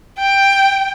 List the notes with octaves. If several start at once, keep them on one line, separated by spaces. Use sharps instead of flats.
G5